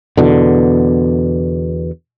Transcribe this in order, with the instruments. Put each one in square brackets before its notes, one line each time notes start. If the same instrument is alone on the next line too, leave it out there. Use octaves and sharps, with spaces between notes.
[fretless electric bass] E2 B2 D3